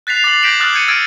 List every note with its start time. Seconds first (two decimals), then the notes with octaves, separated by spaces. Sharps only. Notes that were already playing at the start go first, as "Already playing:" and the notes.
0.07 F#6 A6 B6 C7 F7
0.24 D6 A6 B6 C7 F#7
0.43 G6 A#6 B6 D7 E7 F#7
0.60 D6 D#6 F6 F#6 A6 F#7
0.74 G6 G#6 C#7 D#7
0.88 E6 F6 G#6 A6 D7 D#7